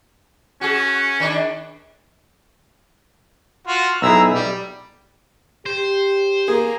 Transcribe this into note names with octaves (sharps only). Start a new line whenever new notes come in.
C#4 F#4 G#4
D#3 D4
F4 F#4
B1 E4 G#4 A#5 E6
G3
G4 C5
A#3 G#4